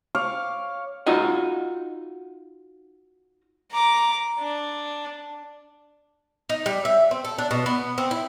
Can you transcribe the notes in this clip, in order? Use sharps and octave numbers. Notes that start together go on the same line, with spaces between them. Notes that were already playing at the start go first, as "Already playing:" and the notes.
C#5 F5 D6
D#4 F4 F#4 D#5
A#5 D6
D4
D#4
G3
E5
C4
A4
D4
B2
B3
C4
E4